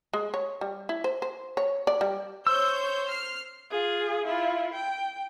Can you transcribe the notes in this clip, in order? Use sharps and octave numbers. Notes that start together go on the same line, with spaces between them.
G#3
C#5
G3
E4
C5
C5
C#5
D5
G3
C5 C#5 E6 G6
F6 C7
F4 G#4
E4 F4
G5